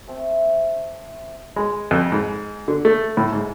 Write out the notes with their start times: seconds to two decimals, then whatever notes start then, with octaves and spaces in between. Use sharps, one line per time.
0.07 A3 C4 A5
1.56 G#3
1.91 F2
2.12 G#2
2.68 D3
2.85 A3
3.17 A2
3.33 G#2